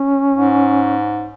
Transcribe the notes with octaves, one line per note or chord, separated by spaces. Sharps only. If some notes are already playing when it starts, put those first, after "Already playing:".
Already playing: C#4
G#2